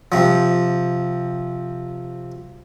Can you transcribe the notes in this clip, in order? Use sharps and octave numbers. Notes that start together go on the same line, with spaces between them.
C3 F3